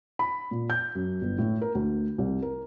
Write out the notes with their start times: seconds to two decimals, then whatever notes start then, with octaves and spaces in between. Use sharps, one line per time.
0.19 B5
0.51 A#2
0.70 G6
0.95 F#2
1.21 G1
1.38 A2
1.62 A#4
1.75 D2
2.18 C2
2.42 A#4